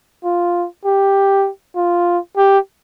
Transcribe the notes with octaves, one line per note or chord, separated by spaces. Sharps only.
F4
G4
F4
G4